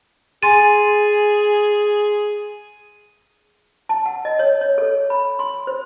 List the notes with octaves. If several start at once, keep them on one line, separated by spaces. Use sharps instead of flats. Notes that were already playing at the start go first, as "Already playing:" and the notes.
G#4 G#5 C6 A6 D#7
A5
F#5
D#5
C#5
C#5
A4
B5
C6
C5